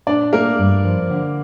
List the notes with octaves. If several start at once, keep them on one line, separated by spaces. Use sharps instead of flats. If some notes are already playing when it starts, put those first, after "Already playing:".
A#2 D4 D5
A3 A#3 A#4
G2
F3
D3